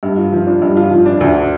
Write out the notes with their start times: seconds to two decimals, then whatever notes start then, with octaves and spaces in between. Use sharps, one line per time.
0.03 G2
0.17 F4
0.33 F3
0.47 D4
0.62 G2
0.77 F4
0.91 F3
1.06 D4
1.20 D2